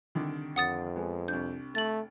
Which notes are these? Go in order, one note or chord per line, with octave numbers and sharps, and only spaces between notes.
C2 D3 D#3
F2 F#5 D#6 A6
G#3 B3
C2 D4 G6
A3 A6 F#7